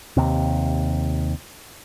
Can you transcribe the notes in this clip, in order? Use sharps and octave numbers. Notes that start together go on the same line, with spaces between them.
D#2 C3